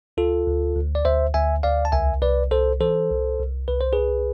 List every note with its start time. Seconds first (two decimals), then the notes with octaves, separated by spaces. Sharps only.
0.17 D2 F4 A4
0.47 D2
0.76 D2
0.95 D5
1.05 D2 C5 E5
1.34 D2 E5 G#5
1.63 D2 D5 F5
1.85 A5
1.92 C2 E5 G#5
2.22 C2 B4 D5
2.51 C2 A4 C5
2.80 E3 A4 C5
3.10 C2
3.39 C2
3.68 C2 B4
3.81 C5
3.93 C2 G#4 B4